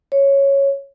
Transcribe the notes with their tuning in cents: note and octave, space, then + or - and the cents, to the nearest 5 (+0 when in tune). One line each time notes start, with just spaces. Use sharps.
C#5 -5